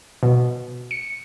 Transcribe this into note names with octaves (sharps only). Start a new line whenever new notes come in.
B2
C#7